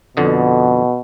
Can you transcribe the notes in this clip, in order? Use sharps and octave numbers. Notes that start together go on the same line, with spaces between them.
F2 B2 D3 D#5